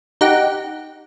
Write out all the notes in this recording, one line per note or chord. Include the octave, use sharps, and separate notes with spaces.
D#4 G4 F#5